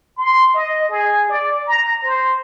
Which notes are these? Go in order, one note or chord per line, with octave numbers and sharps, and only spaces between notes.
C6
D#5
G#4
D5
A#5
C5